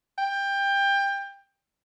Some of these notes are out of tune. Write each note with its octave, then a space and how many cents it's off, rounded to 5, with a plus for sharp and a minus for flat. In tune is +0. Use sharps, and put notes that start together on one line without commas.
G5 +20